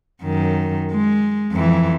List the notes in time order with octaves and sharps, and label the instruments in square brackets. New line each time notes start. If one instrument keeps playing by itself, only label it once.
[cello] F#2 D#3
G#3
F2 E3